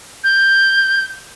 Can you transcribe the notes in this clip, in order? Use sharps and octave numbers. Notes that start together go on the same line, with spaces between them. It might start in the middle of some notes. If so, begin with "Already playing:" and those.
G6